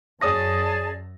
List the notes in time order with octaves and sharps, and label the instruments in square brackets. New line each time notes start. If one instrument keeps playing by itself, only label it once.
[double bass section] F#2 [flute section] G#4 D5 A5 [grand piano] C#5 D#6 A#6